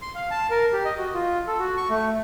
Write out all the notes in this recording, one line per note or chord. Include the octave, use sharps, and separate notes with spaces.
C6
F5
A5
A#4
G4
D#5
F#4
F4
A4
F#4
C#6
A3